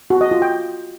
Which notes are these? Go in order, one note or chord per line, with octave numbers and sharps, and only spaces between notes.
F#4
D#5
F4
G5